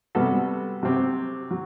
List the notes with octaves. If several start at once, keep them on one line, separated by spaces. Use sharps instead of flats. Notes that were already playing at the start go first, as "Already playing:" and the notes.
C3 G3 B3 F#4 A4
C3 F#3 C4 G4
F#3